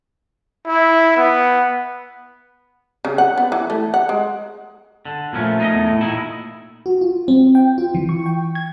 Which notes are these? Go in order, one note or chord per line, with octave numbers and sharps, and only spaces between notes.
E4
B3
C#3
F#5
B3
E3
A3
F#5
G#3
D3
A#2 F3 A3 C#4
D#4 A#4 D#5
E2
A2
A#2 D#4 E4
F#4
F4
C4
G5
F4
E3
C#6
G5
G#6